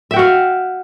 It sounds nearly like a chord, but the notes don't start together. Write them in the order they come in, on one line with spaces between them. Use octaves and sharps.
E5 G5 F#4 F5